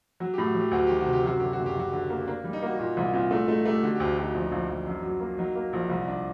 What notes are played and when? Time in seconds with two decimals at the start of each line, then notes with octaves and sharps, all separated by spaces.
0.20 F#3 F#4
0.34 A2 G4
0.46 F#4
0.55 F#3
0.60 G4
0.71 D2 F#4
0.87 D#3 G4
1.01 F#4
1.06 C3
1.13 G4
1.24 F#2 F#4
1.40 D3 G4
1.53 F#4
1.59 F#1
1.66 G4
1.76 F#3 F#4
1.93 D3
2.10 A#3
2.27 A#3 D4
2.44 G3
2.53 D#4
2.63 A#3 F#4
2.79 A#2 F#4
2.97 C2
3.13 A#2 C4
3.31 A3 D4
3.48 A3 D#4
3.65 A3 G4
3.83 D3 F#4
3.95 G4
4.00 D2
4.18 D2 D#4
4.34 A#1 D4
4.42 D#4
4.51 A#1 D4
4.69 A#1
4.87 F#2
5.03 F#3
5.20 A#3
5.38 F#3 D#4
5.55 A#3
5.73 A#1
5.90 C2
6.08 D4